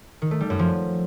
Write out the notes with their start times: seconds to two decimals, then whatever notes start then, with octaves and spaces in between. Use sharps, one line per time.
0.22 D#3
0.31 A3
0.41 G3
0.50 F#2
0.59 F3